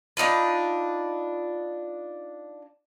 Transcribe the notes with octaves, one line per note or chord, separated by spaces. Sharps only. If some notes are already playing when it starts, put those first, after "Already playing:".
D4 D#4 F4 B4